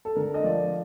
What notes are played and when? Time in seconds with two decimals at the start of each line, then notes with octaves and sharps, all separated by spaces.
0.05 A4
0.16 D3 A#4
0.34 D#5
0.44 F3 D5